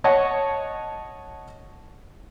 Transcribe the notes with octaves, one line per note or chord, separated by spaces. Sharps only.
C#5 D#5 F#5 A5